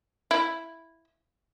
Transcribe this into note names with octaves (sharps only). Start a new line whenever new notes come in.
E4